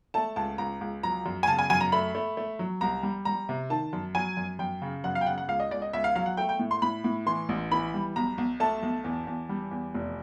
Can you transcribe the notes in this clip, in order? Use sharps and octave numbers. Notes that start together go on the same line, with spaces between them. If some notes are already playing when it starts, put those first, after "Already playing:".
A3 A5
C#2 A5
C#2 A#5
C#2
F#3 A#5
F#2
G#5
C#3 A5
G#5
F#2 G#5
A#5
A3 B5
A3
A3
F#3
C2 A#5
G3
G3 A#5
C3
D#3 A5
F#2
F#3 G#5
F#2
F#2 G5
C#3
F#2 F#5
F5
G5
C#3 F#5
F#5
C#2 F5
D#5
C#2 D5
D#5
C#2 E5
F5
F#3 F5
F#5
A3 G5
G5
A2
C6
A2 B5
A2
E3 C6
A1
E3 B5
G3
B1 A#5
B1
A3 A5
B1
E2
E2
G3
E2
F1